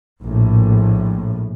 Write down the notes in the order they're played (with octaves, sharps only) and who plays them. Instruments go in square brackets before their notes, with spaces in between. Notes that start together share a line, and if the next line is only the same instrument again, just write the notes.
[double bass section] A#1 A2